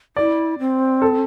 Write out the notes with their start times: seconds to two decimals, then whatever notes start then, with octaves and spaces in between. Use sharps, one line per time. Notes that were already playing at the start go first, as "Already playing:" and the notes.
0.16 E4 D5
0.59 C4
1.02 A4